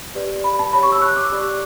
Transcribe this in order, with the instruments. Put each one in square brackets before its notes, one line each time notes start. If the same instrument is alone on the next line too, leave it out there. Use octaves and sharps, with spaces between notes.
[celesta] G4 B4 D5
B5
A5
G4 C#5 B5
C#6
E6
F#6
D6
G4 D5